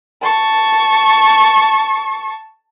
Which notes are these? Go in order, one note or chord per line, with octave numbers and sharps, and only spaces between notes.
A5 C#6